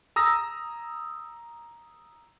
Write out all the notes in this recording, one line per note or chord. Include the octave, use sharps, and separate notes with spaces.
A#5 D#6 E6 A#6